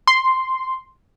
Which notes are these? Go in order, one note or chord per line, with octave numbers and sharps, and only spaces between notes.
C6